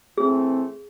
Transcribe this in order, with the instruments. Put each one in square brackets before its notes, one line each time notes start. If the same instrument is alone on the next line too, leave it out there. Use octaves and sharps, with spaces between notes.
[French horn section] E3 A3 C4 [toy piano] G#4